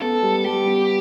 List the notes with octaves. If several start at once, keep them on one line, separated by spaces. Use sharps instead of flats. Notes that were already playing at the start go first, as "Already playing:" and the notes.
B3 A4
G3
G3 G4
B3